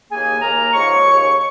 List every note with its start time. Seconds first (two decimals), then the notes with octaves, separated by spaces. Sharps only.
0.10 D#2 C#3 A#3 G#4 G#5
0.41 D#2 C#3 A#3 A#4 A#5
0.73 G#2 F3 G#3 C#5 C#6
1.05 D#2 C#3 A#3